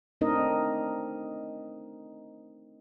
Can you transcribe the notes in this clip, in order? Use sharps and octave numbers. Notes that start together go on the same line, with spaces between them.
A3 C4 D4 D#4 A#4 D#5